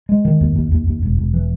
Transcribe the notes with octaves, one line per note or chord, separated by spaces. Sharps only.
G#3
D#3
D#2
D#2
D#2
D#2
E1
E1
E3